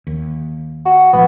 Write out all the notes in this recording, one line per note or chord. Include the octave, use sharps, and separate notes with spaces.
D#2
F#4
G#1 A2 F3 B3